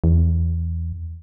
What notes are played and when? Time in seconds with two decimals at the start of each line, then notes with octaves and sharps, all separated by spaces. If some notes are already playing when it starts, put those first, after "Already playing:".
0.04 E2